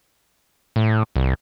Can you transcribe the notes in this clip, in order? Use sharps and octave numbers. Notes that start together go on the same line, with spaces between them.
A2
C2